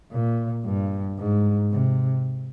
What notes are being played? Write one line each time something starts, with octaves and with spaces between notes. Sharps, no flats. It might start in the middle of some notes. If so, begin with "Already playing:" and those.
A#2
G2
G#2
C3